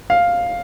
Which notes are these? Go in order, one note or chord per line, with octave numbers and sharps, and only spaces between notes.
F5